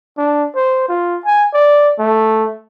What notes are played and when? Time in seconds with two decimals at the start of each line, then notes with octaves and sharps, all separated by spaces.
0.17 D4
0.55 C5
0.88 F4
1.25 G#5
1.54 D5
1.99 A3